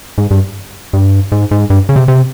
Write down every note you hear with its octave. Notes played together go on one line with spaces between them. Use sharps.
G#2
G2
G2
G#2
G#2
G2
C#3
C3
C3